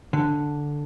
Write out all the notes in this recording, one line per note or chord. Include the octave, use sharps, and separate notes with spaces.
D3